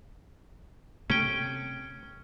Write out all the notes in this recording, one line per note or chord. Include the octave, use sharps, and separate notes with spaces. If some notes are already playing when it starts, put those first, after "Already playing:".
C3 A3 C#4 G5